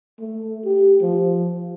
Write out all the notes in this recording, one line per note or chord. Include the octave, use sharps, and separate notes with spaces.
A3
G4
F3